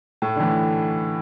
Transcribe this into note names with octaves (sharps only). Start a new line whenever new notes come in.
A2 A3
D3
A2 E3